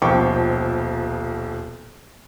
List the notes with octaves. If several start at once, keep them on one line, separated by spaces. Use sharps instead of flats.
D#1 B1 F3 G5 C#6 D6